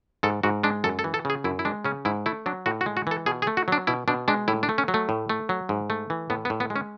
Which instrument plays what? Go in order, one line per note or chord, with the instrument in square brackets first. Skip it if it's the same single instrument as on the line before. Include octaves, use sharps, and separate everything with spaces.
[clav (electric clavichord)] G#2 A4
G#2 F#4
G#3 D4
F#2 A4
A4
E3
A4
C#3 G#4
F#2 E4
E4
G#3 D4
C#3 C#4
G#2 E4
A3 E4
F#3 D4
A2 F#4
F#4
G#3
F#4
E3 A4
B2 G#4
G#4
A3
F#4
F#3 D4
B2 E4
B2 D4
G#3 D4
A2 E4
D4
A3
C#4
F#3
A3
A2
A3
F#3
G#2
A3
E3
A2 B3
B3
A2
B3
G#3
C#4